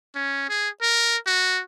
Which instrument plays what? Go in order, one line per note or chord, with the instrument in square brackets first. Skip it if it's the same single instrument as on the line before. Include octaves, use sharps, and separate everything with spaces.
[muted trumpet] C#4
G#4
A#4
F#4